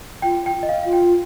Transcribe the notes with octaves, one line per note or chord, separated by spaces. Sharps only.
F4 G5
G5
D#5
F5
F4 F5
G5